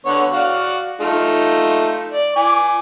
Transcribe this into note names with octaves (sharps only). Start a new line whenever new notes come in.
D3 B3 C#5
F#4 D5 F5
A3 D#4 F4
D5
G#5 D6